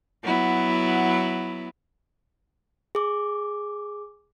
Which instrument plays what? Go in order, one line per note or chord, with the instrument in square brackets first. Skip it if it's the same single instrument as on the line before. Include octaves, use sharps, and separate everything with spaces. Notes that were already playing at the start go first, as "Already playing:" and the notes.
[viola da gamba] F#3 B3 E4
[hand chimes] G#4 D6